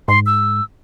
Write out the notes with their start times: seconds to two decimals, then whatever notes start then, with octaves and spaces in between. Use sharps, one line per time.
0.08 G#2 C6
0.26 E6